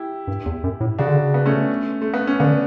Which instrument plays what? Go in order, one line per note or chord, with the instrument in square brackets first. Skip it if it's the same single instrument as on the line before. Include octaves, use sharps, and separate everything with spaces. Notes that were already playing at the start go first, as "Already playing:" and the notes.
Already playing: [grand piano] E4 G4
[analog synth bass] G2
E2
F#2
A2
[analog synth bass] C#3 [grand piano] D4 F#4
[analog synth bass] D3
C#3
[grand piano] B3
A3 C#4
A3
B3
C#4
[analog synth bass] D3 [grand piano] B3 D4